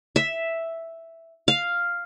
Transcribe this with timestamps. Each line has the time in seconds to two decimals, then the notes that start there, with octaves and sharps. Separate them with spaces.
0.16 E5
1.48 F5